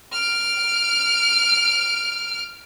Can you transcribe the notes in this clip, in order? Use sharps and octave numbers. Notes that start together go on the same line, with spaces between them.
F6 D7